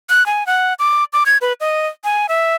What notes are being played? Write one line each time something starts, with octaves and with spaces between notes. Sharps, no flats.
F#6
G#5
F#5
D6
D6
G#6
B4
D#5
G#5
E5